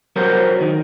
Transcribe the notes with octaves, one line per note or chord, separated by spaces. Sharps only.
F#3 A#4 C5
F#3
F#3
D#3